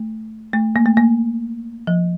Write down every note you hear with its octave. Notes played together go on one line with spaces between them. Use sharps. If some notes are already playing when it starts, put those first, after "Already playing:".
Already playing: A3
A3
A#3
A3
A#3
F3